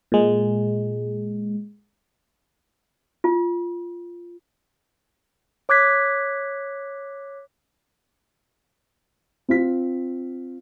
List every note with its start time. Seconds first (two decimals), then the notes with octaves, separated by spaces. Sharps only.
0.12 A#2 G#3
3.24 F4
5.69 C#5 D6 F#6 G#6 B6
9.48 C4 F4 B6